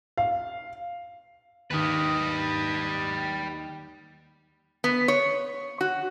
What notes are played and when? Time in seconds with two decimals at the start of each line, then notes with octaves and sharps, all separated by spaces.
0.18 F5
1.71 D#2 D#3 G4 B4
4.84 B3
5.08 C#5
5.81 F#4